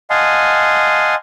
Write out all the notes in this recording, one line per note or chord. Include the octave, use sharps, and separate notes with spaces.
D#5 F5 F#5 G#5 A5 C6